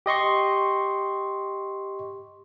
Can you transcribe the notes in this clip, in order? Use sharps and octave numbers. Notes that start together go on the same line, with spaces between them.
G4 D#5 C6 C#6